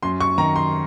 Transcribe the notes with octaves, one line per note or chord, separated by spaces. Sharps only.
F#2 C6
C#6
D#3 A#5
C6